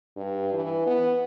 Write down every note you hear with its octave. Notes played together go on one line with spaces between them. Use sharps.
G2
E3
B3